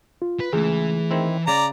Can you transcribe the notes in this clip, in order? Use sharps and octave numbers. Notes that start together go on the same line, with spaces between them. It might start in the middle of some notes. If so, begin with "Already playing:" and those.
F4
B4
C#2 E3 A3 G#4
D#3 C4 E4
C#3 D5 A#5